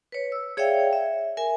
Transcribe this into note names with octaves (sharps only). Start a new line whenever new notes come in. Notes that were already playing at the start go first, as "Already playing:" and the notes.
B4 C#5
E6
G#4 C#5 D5 E5 F5 G5
E5
A#4 E5 G#5